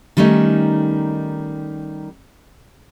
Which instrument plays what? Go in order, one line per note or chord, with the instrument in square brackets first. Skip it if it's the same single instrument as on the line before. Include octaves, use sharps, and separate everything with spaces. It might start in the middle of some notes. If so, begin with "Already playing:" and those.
[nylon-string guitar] D#3 G3 A3 C#4 D#4